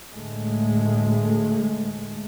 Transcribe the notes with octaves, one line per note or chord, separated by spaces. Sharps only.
D2 A2 G#3 A3